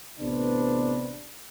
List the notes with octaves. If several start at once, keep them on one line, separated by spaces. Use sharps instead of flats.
A1 C3 B3 D4 B4 C5